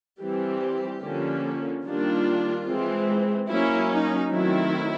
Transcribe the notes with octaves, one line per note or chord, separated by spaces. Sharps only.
E3 G3 C4 G4
D3 F3 A#3 C#4
D#3 G3 A#3 D4 F4
E3 G#3 C4
F#3 A#3 C#4 E4
D#4
D#3 F#3 A3 C4 E4